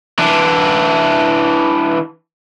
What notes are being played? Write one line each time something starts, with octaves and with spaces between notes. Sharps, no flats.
E3 D4